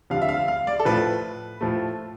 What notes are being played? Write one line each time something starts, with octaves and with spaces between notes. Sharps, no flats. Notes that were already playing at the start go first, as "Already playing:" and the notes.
F2 D3 G3 F5
E5
F5
F5
D5
A4
A2 F3 A3 B4
A2 F3 A3